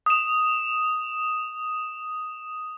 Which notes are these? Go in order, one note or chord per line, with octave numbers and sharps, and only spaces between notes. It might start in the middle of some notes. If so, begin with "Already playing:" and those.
D#6 E7